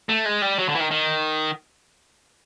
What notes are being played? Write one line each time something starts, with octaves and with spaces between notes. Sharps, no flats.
A3
G#3
G3
F#3
D3
E3
D#3
D#3